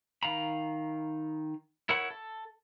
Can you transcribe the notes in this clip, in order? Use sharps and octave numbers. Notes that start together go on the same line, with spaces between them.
D#3 F5 A#5 B5
E4 A#4 C#5 F#5 B5
A4